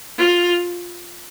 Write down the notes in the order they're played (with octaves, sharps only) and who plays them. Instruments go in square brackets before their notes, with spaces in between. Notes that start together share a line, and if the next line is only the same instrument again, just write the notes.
[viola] F4